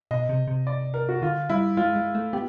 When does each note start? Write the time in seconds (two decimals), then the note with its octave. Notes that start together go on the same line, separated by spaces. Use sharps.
0.11 B2 D#5
0.29 C3
0.47 C3
0.67 D5
0.94 A#4
1.09 F#4
1.22 D3 F4
1.49 G3 E4
1.77 G#3 F4
1.96 G#3
2.15 A3
2.33 B3 G4